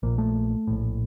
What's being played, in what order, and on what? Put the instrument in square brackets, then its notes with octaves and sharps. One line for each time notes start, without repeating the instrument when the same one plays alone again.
[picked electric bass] A#1 A#2 A#3
A3
A#1 A2